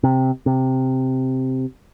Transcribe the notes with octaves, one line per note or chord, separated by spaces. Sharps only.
C3
C3